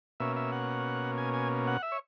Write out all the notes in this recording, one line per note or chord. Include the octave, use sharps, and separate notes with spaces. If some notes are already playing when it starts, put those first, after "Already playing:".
B2 A#3 C#4 E5
E5
F#5
G#5
G#5
F#5
E5
C#5